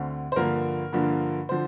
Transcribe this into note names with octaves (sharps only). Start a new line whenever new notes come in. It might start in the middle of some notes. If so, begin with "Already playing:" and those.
Already playing: D2 D3 C4
C5
G2 D3 F3 A#3 A#4
G2 D3 F3 A#3
D3 F3 C5